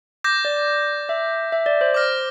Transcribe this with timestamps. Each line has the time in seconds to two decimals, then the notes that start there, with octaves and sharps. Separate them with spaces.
0.24 D6 G6 A#6
0.45 D5
1.09 E5
1.52 E5
1.66 D5
1.81 C5
1.94 D6 F6 A#6